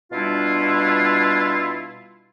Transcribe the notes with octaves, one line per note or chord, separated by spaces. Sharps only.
B2 G3 D4 E4 F4